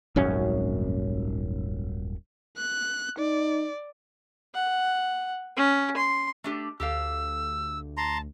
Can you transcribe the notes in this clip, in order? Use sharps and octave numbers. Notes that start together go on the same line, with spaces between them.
D#1 G#1 F#2 C#4
F#6
D#4 D5
F#5
C#4
C6
A3 D4 G4
D2 G4 A4 F5 E6
A5 A#5 C6